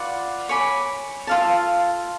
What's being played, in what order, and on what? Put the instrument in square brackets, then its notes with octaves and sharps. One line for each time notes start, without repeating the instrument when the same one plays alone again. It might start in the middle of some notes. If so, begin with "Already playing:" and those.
Already playing: [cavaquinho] F4 B4 D5 F#5
C#5 G#5 B5 D6
F4 A4 F5 A5